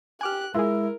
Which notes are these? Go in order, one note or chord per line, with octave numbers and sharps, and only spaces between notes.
G4 G#5 D6 F6 F#6
G#3 E4 F4 G#4 A#4